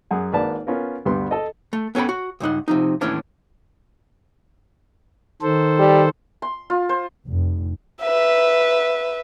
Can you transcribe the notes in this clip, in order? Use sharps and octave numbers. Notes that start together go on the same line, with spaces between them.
F#2 G#4 F#5
G#1 A#3 D4 B4 D5 A5
B3 C#4 F4 A#4
D2 G2 G3 B3 C6
A4 D#5
A3
B3 C#4 A4 G5 B5
F#4
C#2 G2 D#4 F#5
C3 F3 D#4
D#2 A2 E3 C#4 D4
D#3 A4 C5
G3
C6
F4
C5
F1
B4 E5